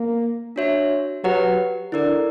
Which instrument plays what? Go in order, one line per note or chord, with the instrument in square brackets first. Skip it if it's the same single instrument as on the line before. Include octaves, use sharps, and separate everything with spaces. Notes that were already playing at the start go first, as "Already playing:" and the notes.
Already playing: [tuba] A#3
[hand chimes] D4 F#4 C#5 E5
[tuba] F#3 [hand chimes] G4 B4 F#5
[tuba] D3 [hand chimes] E4 A#4 D5